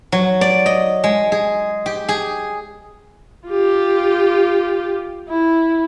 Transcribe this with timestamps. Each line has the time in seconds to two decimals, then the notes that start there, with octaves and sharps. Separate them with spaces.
0.12 F#3
0.41 D5
0.66 D#5
1.04 G#3
1.32 G#4
1.86 G4
2.09 G#4
3.47 F4 G4
5.29 E4